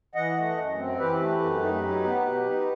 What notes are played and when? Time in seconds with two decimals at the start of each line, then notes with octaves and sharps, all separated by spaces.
0.15 E3 D#5 F#5
0.37 A3
0.57 F#2
0.78 C4
0.99 E3 G4 B4
1.20 A3
1.41 F#2
1.62 D#4
1.84 F#3
2.04 B3
2.25 B2
2.46 D#4